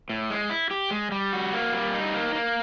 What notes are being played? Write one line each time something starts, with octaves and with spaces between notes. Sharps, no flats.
A2
G#3
E4
G4
G#3
G3
F#4
A#3
G3
D#4
A#3
A#3